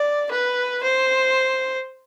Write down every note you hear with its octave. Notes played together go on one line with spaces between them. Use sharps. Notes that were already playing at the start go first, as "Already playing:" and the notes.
Already playing: D5
B4
C5